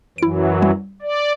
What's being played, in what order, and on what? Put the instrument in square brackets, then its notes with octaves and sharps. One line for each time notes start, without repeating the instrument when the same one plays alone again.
[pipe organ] F#2 E3 F#3 [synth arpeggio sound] E4 D7
[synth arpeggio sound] G3
[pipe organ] D5